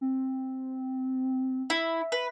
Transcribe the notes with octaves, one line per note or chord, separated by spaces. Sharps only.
C4
E4
B4 B6